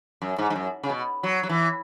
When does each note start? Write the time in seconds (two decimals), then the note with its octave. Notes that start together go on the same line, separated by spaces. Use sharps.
0.22 F#2
0.38 G#2
0.50 G#2
0.55 F#2
0.83 C#3
0.90 B2
1.23 F#3
1.43 F#3
1.49 E3